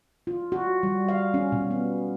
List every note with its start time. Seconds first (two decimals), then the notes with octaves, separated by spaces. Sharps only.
0.27 F4
0.52 F#4
0.83 G3
1.09 F5
1.34 C#4
1.52 B2
1.71 B3